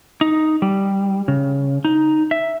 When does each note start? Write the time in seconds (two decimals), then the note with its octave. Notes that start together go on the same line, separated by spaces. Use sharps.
0.21 D#4
0.62 G3
1.28 C#3
1.85 D#4
2.31 E5